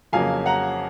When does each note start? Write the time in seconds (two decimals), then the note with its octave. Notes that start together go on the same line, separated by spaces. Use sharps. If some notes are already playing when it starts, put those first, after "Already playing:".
0.13 F2 C#3 F#3 A#3 F5 G#5
0.46 F#5 A#5